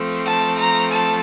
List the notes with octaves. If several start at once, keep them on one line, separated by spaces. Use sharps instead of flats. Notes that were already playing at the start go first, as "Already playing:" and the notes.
Already playing: F3 A3 C4
A5
A#5
A5